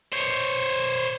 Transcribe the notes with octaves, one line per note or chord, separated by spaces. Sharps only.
C5 C#5